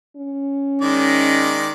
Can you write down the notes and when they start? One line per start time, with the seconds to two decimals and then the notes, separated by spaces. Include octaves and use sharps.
0.17 C#4
0.82 D#3 G#3 D5